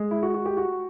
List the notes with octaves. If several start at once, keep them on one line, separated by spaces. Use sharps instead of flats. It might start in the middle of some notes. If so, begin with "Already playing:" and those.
Already playing: G#3
E4
F#4
F#4
G4
F#4